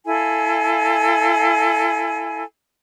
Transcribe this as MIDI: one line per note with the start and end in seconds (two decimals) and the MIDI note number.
0.07 2.44 64
0.07 2.44 69
0.07 2.44 77
0.07 2.44 80